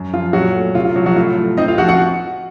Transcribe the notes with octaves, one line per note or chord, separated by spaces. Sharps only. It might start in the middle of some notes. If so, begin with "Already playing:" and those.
Already playing: F#2
F3 F4
A#2 F#3 F#4
A3
C3 F4
F4
F3 F#3 F#4
F#3 F#4
A2 F4
A3
C4 D#4 D#5
F4 F5
F3 F#4 F#5
F#4 F#5